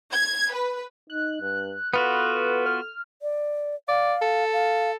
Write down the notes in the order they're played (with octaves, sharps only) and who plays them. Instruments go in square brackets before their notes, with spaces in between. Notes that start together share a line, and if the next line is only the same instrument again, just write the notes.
[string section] G#6
B4
[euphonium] D#4 [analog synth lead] F#6
[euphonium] G2
[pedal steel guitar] B3 F4 F#4 [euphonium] A4 [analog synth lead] B4
[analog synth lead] F6
[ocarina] D5
[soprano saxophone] D5 [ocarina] F5
[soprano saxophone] A4
[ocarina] F5